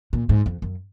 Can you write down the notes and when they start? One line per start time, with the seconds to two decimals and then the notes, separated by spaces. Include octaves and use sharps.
0.13 A#2
0.29 G#2
0.46 F2
0.62 F#2